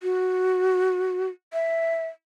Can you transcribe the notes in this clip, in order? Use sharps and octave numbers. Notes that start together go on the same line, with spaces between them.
F#4
E5